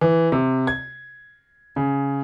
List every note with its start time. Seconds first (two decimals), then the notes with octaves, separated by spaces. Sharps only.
0.01 E3
0.32 C3
0.67 G#6
1.76 C#3